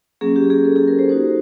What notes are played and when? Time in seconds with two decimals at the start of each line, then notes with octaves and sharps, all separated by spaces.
0.21 F#3 A#3 C#4 G#4
0.36 G4
0.50 G#4
0.65 A4
0.76 G#4
0.88 A#4
0.99 C5
1.09 A#3 D#4 F#4 C5